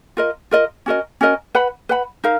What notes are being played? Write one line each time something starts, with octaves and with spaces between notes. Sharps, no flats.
F4 A#4 D#5
F4 A#4 D#5
C#4 F#4 A#4 D#5
C#4 F#4 A#4 D#5
B4 F#5 B5
B4 F#5 B5
D#4 A#4 F5